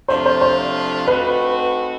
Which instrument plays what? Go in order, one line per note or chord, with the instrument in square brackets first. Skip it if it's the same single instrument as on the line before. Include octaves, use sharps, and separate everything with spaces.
[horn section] C3 F3 A3 D4 F4 [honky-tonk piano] C5
[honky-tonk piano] C5
C5
[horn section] A3 C4 D#4 F#4 [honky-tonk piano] B4